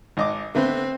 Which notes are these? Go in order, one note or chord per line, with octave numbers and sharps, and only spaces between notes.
G#1 D#5 D6
D3 A3 B3 C4